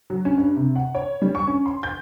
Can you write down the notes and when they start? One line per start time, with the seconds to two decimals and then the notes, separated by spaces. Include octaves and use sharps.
0.10 F#3
0.25 C#4
0.37 G2
0.56 C3
0.76 F#5
0.95 C#5
1.22 G3
1.35 C#6
1.47 C#4
1.66 C6
1.83 G6